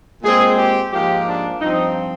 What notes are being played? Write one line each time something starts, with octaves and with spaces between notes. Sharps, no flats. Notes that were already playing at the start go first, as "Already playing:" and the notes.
A#2 G#3 C4 G#4
G4
G#2 F3 A#3 G4
D4
G2 F3 C4 D#4